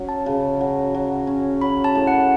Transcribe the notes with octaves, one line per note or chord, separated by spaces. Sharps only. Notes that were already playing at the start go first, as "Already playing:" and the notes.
Already playing: F#3 C#4
A5
C#3
F#3
F#3
C#4
F#3 B5
A5
A2
F#5